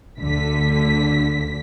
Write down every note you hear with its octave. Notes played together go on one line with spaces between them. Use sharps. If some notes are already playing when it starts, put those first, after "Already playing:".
D2 D3 B6